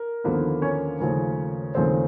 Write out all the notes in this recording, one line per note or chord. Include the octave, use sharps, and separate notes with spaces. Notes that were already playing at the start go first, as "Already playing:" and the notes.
Already playing: A#4
D#2 D3 F3 A#3 B3 B4
C#4 C#5
D#2 C#3 F3 A3
D#2 C#3 F3 A3 C4 C5